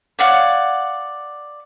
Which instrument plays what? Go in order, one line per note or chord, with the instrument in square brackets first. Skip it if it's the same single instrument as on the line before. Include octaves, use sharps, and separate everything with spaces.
[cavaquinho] C#5 D5 F5 F#5